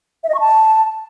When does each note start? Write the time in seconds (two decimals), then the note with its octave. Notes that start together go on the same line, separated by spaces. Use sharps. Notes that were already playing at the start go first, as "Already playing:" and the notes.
0.23 E5
0.29 D#5
0.34 C#6
0.40 A5